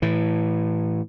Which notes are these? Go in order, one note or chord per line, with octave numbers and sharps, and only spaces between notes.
A2 E3